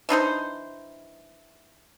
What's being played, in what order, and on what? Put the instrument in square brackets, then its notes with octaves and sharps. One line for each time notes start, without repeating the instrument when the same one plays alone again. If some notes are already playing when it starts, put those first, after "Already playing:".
[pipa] E3 D4 D#4 C5